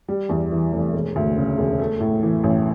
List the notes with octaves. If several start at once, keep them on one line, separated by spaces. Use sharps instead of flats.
G3
E2
E3
F1
E1
D2
C#3
E1
A3
A2
E3
A1